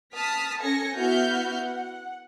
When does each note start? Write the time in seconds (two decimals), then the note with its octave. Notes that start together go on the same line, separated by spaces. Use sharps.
0.14 A5 D#6 F6 B6
0.61 C#4 A4 G#5 A#6 C#7
0.96 B3 E4 F#4 E5 F6 G6
1.56 F#5